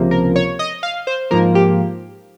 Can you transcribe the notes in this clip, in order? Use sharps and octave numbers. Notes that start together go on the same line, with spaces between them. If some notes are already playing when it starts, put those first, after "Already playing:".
Already playing: C#2 C3 F3 A#3
A#4
C#5
D#5
F5
C5
G#2 F3 A#3 A#4
G4